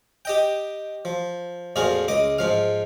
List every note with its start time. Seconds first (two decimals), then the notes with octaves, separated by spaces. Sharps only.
0.25 G4 D#5 G5
1.05 F3
1.76 F2 A#2 F3 F#4 G#4 F5
2.08 C#2 D#5 D6
2.38 G#2 F3 F5